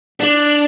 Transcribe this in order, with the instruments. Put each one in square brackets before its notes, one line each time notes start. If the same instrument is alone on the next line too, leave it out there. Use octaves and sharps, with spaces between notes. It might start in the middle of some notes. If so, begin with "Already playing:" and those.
[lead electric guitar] D4